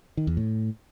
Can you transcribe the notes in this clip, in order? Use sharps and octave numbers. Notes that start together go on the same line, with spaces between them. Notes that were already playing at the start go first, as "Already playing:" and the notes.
D#3
E2
A2